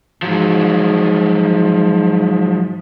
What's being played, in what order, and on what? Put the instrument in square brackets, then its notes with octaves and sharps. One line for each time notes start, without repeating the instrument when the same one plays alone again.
[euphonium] G#2 [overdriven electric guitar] F3 F#3